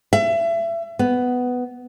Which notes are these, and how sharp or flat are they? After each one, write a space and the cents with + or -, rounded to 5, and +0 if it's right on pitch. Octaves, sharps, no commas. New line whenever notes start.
E5 +30
B3 +10